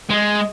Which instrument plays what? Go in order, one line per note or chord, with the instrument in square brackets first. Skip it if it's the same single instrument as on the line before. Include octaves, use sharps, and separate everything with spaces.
[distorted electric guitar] G#3